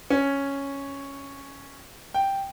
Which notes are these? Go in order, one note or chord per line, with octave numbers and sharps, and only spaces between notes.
C#4
G5